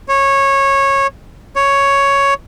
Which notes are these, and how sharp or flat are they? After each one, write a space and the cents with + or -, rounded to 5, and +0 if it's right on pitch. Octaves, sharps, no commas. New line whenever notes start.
C#5 -15
C#5 +5